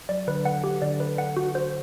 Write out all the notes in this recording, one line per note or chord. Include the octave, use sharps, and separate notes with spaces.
F#3 D5
D3 B4
F#5
G4
D3 D5
B4
F#5
F#4
C5